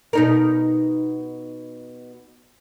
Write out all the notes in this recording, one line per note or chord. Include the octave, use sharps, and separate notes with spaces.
B2 D#4 A#4